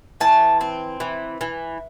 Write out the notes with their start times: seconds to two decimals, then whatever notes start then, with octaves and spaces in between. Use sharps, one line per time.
0.21 E3 A5
0.61 C4
1.00 E3
1.41 E3